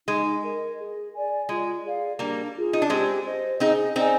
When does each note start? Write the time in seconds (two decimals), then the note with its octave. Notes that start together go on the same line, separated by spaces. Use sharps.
0.07 G#3 D#4
0.43 A#4 D#5
0.78 G#4
1.14 D5 G#5
1.49 G#3 F4
1.84 G#4 D5 F5
2.19 G3 A#3 D4
2.55 F4 G#4
2.73 D#4
2.82 D4
2.90 G#3 C4 G4
3.25 C5 D#5
3.60 C4 D#4 G#4
3.96 C4 D#4 D5 G#5